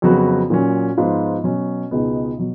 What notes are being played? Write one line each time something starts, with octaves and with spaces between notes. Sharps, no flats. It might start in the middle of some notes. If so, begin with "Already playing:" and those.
F2 C#3 F#3 B3 F#4
A#2 F#3 C#4
G#2 F3 B3 F4
B2 F#3 C#4
C#2 B2 G#3 B3 D#4
B2 F#3